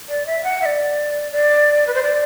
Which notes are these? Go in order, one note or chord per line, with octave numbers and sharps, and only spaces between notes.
D5
E5
F#5
E5
D5
D5
B4
C5
D5